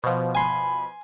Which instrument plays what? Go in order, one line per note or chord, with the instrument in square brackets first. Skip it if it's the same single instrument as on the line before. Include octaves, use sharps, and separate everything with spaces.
[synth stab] B2 F3 [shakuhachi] C5
[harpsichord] G#5 C6 [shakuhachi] B5